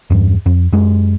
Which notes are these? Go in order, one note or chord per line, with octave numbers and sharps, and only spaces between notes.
E2 G2
F2
F#2 G#3